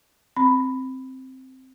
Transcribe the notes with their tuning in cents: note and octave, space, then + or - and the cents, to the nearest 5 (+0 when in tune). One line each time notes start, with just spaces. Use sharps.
C4 +0 B5 +5